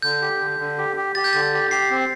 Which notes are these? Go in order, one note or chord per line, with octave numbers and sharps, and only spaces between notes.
D3 G6
G4
D3
D3
G4
G4
G4 A6
G6
D3 A6
G4
G4 C7
C4